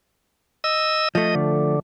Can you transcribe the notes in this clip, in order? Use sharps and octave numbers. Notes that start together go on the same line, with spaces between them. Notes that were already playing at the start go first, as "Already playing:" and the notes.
D#5 E6
F3 A3 D#5
D3